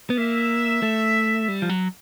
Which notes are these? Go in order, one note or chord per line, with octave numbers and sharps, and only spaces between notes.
B3
A#3 E5
A3
G3
F3
F#3